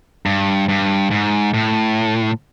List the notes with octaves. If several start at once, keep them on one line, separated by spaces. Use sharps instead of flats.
G2
G2
G#2
A2